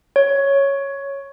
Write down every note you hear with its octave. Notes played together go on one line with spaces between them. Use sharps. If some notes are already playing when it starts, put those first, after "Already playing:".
C#5